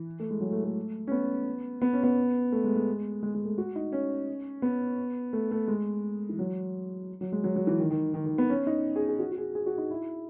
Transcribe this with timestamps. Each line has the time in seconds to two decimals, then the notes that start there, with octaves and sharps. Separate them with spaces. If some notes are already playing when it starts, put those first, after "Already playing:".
Already playing: E3
0.20 A3
0.31 G#3
0.41 F#3
0.52 A3
0.64 A3
1.07 C#4
1.11 B3
1.82 B3
1.93 C#4
2.03 B3
2.52 A3
2.64 G#3
2.76 G#3
3.23 G#3
3.35 G#3
3.45 A3
3.58 F#4
3.76 D#4
3.92 C#4
4.62 B3
5.33 A3
5.51 A3
5.68 G#3
6.29 E3
6.39 F#3
7.21 F#3
7.32 G#3
7.44 F#3
7.56 F#3
7.67 E3
7.80 D#3
7.90 D#3
8.14 D#3
8.26 D#3
8.38 B3
8.50 C#4
8.67 D#4
8.96 G#4
9.09 G#4
9.19 F#4
9.31 F#4
9.38 G#4
9.55 G#4
9.66 F#4
9.78 D#4
9.91 E4